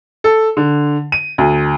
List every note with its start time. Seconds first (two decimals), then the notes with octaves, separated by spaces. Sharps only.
0.24 A4
0.57 D3
1.12 D#7
1.38 D2